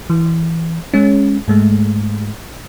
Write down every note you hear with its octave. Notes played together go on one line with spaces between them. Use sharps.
E3
G#3 C#4
G#2 G#3 A3